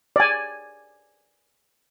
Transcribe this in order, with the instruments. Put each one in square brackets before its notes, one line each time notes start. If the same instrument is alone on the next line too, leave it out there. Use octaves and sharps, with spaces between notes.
[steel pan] D5 G#5